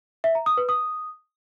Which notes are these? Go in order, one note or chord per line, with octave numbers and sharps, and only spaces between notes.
E5
A#5
D#6
B4
D#6